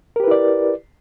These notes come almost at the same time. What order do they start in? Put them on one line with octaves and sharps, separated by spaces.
A#4 G4 B4 E4 D5